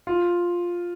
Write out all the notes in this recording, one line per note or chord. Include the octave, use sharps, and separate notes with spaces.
F4